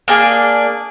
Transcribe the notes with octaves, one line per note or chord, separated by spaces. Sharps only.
A#3 D4 G#4